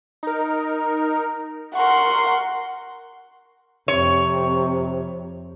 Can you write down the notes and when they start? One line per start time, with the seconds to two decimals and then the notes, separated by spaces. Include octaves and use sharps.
0.23 D#4 A#4
1.75 A#4 F#5 C6 C#6
3.88 F2 C3 C#5